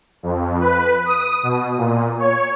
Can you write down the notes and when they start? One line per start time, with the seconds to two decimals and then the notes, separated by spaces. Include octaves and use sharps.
0.23 F2
0.60 B4
1.05 D#6
1.43 B2
1.77 A#2
2.19 C#5